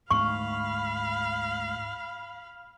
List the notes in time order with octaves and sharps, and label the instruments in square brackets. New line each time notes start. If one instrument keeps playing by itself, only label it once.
[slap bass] D2 G#2 A3 [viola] F5 B5 [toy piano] C#6